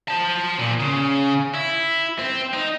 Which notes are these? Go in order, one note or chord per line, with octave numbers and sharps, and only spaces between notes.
C5 A5
A#2
C#3
E4
C4
D#4